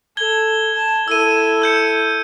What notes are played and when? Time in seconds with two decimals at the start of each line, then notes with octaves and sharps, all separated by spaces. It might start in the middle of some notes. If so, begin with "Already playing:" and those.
0.17 A4 G#6 G7
0.74 A5
1.08 E4 A4 E6 D#7
1.62 E6 G6 C#7